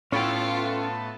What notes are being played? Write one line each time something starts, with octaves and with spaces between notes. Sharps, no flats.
A2 B3 C#4 F4 A4 C#5 G5